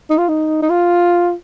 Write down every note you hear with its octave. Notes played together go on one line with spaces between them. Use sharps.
D#4
F4
D#4
D#4
F4